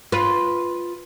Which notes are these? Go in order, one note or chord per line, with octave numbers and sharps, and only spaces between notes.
F4 B4